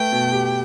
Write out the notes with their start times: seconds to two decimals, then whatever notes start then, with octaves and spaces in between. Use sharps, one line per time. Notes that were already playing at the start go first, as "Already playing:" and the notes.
Already playing: A3 B4 G5
0.12 B2
0.32 G4